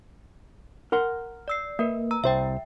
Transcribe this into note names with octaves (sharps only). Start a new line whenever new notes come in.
A#4 F#5 C6
D5 E6 C7
A#3 A#4 B4 E5
A#5 E6
C2 C5 E5 G5